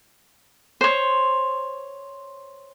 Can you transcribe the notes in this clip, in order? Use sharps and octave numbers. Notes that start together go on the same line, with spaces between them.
C5 C#5